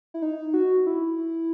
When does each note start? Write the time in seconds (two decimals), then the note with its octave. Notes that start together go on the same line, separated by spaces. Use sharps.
0.14 E4
0.22 D#4
0.53 F#4
0.87 E4